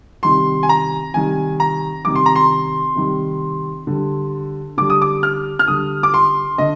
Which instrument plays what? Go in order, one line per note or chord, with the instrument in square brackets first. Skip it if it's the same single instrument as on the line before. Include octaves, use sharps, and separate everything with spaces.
[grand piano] C3 D#3 G3 C6
G#5
A#5
C3 D#3 G3 G#5
A#5
C3 D#3 G3 D6
C6
A#5
C6
C3 D#3 G3
D3 G3
D3 G3 D6
D#6
D6
F6
F6
D3 G3 D#6
D6
C6
D3 D#5